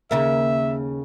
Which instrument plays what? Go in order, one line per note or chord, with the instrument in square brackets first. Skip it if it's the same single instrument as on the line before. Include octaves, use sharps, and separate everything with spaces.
[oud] D#2 C#3 A#3 [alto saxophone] E5